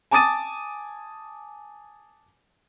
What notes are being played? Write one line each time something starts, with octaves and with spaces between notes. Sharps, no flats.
G#5 A5 D6 D#6 A6 D#7